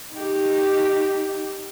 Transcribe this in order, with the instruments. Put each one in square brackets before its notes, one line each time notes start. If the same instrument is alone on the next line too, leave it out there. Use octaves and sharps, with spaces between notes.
[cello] D#4 G4